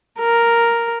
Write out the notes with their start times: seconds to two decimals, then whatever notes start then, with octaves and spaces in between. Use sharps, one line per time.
0.20 A#4